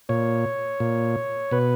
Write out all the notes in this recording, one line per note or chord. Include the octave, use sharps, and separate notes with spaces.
A#2 C#5
A#2
B2 B4